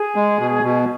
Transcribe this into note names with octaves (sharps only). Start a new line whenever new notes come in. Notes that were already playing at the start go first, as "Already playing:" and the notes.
Already playing: G#4
G#3
B2
B2